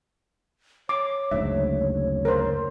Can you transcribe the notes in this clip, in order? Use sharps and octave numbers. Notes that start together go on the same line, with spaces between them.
C#5 D6
F#1 D2 G#2 E5
A#4 C5